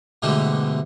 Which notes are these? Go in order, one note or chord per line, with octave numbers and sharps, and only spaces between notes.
G#2 B2 D3 E3 G3 A3